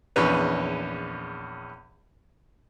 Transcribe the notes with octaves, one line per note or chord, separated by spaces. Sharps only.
A#1 E2 C#4 B4 C#5